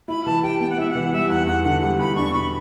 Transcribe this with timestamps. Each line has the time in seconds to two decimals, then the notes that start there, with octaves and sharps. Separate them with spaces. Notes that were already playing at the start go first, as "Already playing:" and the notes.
0.08 E4 B5
0.26 E3 A5
0.43 G4 G5
0.61 B3 G5
0.70 F#5
0.78 E4 E5
0.90 F#5
0.95 E3
1.13 G3 E5
1.30 E2 F#5
1.47 E2 F#5
1.64 D3 F#5
1.81 G3 F#5
1.99 E2 B5
2.16 D4 C#6
2.34 B2 B5